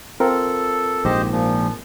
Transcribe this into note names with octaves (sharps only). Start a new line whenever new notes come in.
C4 F4 A4 A#4
A#1 G#2 G4 C5 D#5
A#2 F3